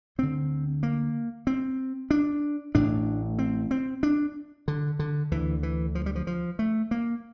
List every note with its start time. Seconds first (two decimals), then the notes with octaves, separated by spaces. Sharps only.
0.18 D2 D3 C4
0.83 A#3
1.47 C4
2.11 D4
2.75 A1 A2 D4
3.39 C4
3.71 C4
4.03 D4
4.68 D3
4.99 D3
5.31 D2 D3 E3
5.63 E3
5.95 F3
6.06 G3
6.15 F3
6.27 F3
6.59 A3
6.91 A#3